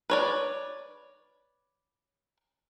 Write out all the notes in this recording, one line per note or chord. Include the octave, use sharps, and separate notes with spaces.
B4 C#5 D5